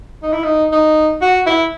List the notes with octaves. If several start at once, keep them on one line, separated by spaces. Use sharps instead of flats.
D#4
E4
D#4
D#4
F#4
E4